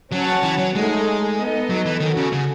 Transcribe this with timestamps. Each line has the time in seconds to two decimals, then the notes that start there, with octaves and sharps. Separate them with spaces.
0.12 F#3 C#4 F#4 C#5 F#5 A5
0.43 E3
0.59 F#3
0.75 G#3 A3 D#4 G#4
1.38 B3 D#4 A4 D#5
1.70 F#3
1.85 E3
2.00 D#3 C#4 F#4 A4
2.17 C#3
2.32 C#3